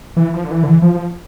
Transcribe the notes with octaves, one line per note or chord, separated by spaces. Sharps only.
E3
F3
D3
E3
D3
E3
F3
F3